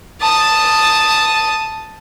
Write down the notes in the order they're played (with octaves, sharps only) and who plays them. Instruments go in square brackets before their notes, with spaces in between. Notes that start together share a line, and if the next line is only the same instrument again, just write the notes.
[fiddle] A5 D#6